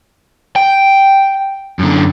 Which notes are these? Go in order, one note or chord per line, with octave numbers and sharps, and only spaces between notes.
G5
F#2 D3